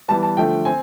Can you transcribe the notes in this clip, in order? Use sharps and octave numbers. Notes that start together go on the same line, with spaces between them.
E3 G3 B3 A5
A5
D3 F3 A3 G5
C4 G#5